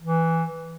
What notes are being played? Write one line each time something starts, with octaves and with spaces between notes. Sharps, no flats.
E3